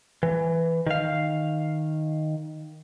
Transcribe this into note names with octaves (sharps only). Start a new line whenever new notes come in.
E3
D#3 F5